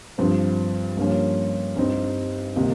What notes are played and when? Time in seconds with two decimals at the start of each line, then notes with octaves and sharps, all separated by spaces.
0.18 G2 F3 C4
0.97 G2 F3 A#3 C#4
1.77 G2 G3 C4 D#4
2.56 C3 D#3 A#3 D#4